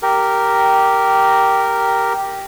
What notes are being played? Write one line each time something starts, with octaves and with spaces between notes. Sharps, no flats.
G4 A#4